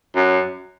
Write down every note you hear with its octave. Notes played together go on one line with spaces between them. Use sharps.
F#2